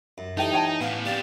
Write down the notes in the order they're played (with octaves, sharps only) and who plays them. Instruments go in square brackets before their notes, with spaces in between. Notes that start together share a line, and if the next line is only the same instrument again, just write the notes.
[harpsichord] F#2
[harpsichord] E3 G4 [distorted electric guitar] D#4 [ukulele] A4 G5
[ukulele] C#5 G5 A5
G#5
[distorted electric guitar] A2 E3 [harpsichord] B3 F5
[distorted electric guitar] B3 C4 [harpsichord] G4 D5 F5